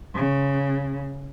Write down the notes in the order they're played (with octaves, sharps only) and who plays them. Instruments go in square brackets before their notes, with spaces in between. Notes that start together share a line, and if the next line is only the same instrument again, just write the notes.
[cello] C#3